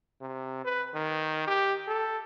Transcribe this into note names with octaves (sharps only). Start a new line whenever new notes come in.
C3
B4
D#3
G4
A4